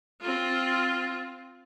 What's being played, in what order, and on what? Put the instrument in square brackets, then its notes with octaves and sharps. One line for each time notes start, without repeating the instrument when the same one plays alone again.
[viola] C4 F4